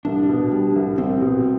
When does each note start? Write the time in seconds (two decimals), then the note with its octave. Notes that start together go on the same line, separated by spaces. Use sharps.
0.05 C2 D4
0.29 B2
0.52 G3
0.76 C2
0.98 C2 C4
1.22 B2